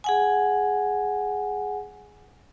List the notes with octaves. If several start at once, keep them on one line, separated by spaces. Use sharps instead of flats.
G#4 F#5 G#5